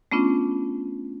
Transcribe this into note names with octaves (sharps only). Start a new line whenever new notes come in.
A3 B3 C#4 D4 F4